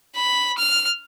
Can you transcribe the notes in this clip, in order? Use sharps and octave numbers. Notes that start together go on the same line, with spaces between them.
B5
F6